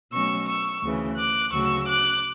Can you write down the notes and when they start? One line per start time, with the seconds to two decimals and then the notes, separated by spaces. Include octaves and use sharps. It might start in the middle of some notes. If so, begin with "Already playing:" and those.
0.12 B2 F#3 A3 C#4 C#6 E6
0.48 C#6 E6
0.83 D2 C#3 E3
1.17 D6 F#6
1.52 D2 C#3 F#3 C#6 E6
1.87 D6 F#6